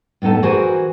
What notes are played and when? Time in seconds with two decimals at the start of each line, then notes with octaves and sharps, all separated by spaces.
0.22 A2 B3 D#4 A4 A5
0.42 E3 F#4 G#4 A#4 C5 G#5